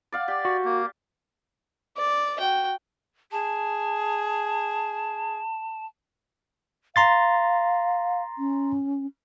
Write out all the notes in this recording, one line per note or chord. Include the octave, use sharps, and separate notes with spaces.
D5 F5 F#5
G4 D5
F#4
A#3
D5
F#4 G5
G#4 A5
F5 A#5 C6 A6
C#4